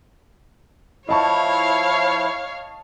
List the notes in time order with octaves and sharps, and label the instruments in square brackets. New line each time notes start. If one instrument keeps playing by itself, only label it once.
[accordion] F3 E4 [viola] C#5 F5 [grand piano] D#5 A5 C#6